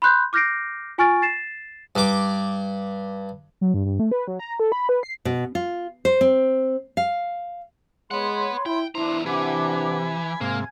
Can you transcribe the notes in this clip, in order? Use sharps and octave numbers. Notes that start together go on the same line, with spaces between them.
B5 C6 F#6 G6
D6 F6 G6 A#6 C7 D7
F4 G#5 C#6 F6 A6 D7
A6 C7 E7
G2 D6
F#3
G2
G2
A3
B4
F#3
A#5
A4
B5
B4
C7
B2
F4
C5
C4
F5
G#3 B4 C#5 F#5 B5 C6
E4 G5
E2 D4 E4 C5 A#5
C3 E3 D4 F#5 G#5 B5 D6
G#2 C3 A#3 G#5 G#6